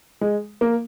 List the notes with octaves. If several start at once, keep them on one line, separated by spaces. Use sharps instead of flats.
G#3
A#3